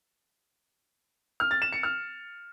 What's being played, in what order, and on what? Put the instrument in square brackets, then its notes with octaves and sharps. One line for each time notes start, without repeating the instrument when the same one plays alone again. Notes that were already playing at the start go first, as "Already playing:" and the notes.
[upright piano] F6
A6
E7
C#7
F6